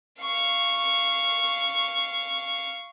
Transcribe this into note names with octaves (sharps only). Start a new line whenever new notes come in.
F5 C#6